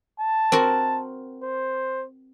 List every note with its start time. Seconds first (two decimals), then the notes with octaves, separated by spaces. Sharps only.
0.20 A5
0.52 C4 F#4 A#4
1.43 C5